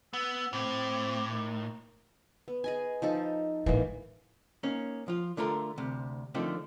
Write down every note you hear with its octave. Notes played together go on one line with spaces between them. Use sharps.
B3 E6
A2 C4 D6
D#3
B3
G#4 D#5 G#5
F3 D#4 A4
A1 D#3 E3 G#3 A#3
A#3 C#4 D#4
F3 F4
D3 A3 F4 A#4
D2 C3
D3 D#3 F3 A3 C4